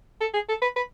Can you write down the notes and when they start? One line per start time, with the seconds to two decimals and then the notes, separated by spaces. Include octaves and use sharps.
0.21 A4
0.34 G#4
0.49 A4
0.62 B4
0.76 B4